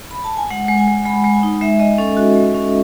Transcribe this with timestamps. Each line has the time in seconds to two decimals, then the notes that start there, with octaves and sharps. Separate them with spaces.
0.11 B5
0.24 A5
0.37 G#5
0.50 G#3 F#5
0.68 G#3
0.78 G#5
0.87 G#3
1.05 G#3 B5
1.24 G#3
1.33 G#5
1.43 D#4
1.61 G#3 E5
1.79 G#3 D#5
1.98 C#4 A4
2.17 F#4
2.35 G#3
2.54 C#4